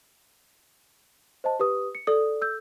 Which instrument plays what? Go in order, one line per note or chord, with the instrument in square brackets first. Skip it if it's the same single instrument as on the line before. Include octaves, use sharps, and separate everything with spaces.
[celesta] C5 D#5 A5
G4 B4 D#6
C#7
[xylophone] A4 D#6 [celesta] D5
[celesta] E6 G6